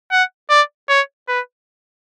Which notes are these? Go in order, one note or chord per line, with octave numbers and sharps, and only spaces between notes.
F#5
D5
C#5
B4